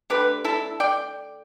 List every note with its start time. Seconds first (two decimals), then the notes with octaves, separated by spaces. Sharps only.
0.10 D3 A3 G4 B4
0.45 E4 A4
0.80 D5 G5